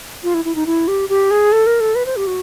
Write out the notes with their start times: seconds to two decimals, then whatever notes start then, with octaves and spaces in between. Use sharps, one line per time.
0.23 F4
0.34 E4
0.45 E4
0.55 D#4
0.66 E4
0.88 G4
1.09 G4
1.31 G#4
1.52 A4
1.67 A#4
1.80 A4
1.95 B4
2.06 C5
2.16 G4
2.27 F#4